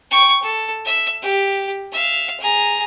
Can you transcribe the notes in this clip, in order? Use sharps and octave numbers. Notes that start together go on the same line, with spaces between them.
G5 C#6
A4
E5
G4
E5 F5
G#4 A#5